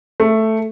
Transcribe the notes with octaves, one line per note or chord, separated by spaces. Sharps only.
A3